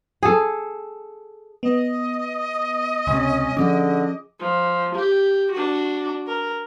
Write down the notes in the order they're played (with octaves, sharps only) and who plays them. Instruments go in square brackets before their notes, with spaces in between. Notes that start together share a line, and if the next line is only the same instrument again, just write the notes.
[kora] G#4 A4
[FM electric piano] B3 [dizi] D#5
[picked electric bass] C#2 C3 [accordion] C#4
[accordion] D3 [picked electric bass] F3 C#4 [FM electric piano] G#4 D6
[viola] F3
G4
D4 F#4
A#4